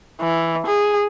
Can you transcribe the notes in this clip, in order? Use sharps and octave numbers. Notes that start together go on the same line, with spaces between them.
E3
G#4